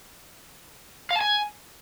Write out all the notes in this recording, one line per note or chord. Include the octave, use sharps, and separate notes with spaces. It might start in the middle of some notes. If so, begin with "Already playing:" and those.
F5
A5
G#5